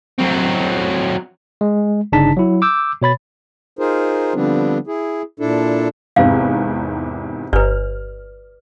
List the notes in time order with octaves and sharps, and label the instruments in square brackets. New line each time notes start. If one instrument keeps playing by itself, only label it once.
[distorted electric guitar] F#3 C4
[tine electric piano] G#3
G1 C#3 D4 D#4 A5 B6
F#3 E4
D6 E6 G6
B2 C#5 B5 A6
[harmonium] D#4 F4 G#4 A#4 C5
D3 F3 G3 B3 C4 D4
E4 G#4
A#2 D4 E4 A4
[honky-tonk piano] G#1 E2 C3 [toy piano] F5
[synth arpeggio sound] G1 [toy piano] B4 D5 [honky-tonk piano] F6